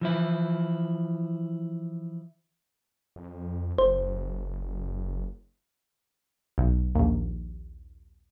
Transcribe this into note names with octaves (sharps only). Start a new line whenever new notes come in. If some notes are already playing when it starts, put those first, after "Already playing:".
E3 F3 E4
F2
F#1 C5
B1
A#1 D#2